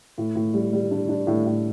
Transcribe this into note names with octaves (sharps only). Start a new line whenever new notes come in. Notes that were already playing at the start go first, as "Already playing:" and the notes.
A2
A2
G3
G3
D4
D4
A2
A2